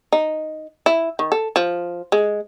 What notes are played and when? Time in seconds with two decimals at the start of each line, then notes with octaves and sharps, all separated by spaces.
0.12 D#4
0.86 E4
1.19 D#3
1.32 A4
1.56 F3
2.12 G#3